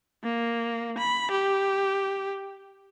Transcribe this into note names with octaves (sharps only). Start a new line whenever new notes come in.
A#3
B5
G4